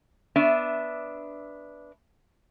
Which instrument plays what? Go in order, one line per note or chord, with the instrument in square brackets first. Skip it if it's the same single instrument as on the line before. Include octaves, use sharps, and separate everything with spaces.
[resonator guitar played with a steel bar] B3 D4 E5